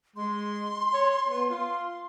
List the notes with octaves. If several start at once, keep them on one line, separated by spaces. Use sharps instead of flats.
G#3 C6
C#5
B3
F4 C6